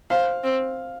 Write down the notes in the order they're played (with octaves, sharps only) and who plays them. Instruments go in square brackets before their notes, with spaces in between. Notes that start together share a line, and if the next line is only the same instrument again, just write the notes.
[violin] C5 [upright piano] F5
[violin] C4